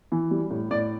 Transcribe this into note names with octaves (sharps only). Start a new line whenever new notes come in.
E3
G3
A2
A2 D5